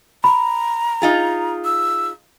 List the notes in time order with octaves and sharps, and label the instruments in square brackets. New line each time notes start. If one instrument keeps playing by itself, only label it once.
[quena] A#5 [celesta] B5
[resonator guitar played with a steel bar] D#4 F4 G#4
[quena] E6